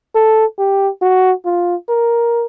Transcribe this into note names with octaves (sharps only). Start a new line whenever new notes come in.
A4
G4
F#4
F4
A#4